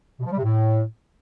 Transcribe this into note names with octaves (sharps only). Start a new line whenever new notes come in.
B2
F3
G3
C3
A2